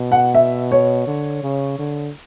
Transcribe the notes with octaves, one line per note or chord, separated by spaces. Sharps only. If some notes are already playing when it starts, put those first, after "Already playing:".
Already playing: B2
F#5
E5
C#5
D3
C#3
D3